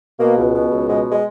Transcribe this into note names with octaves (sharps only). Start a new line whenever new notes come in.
B2 A#3
C#2
B2
C#2
B2 G#3
G#3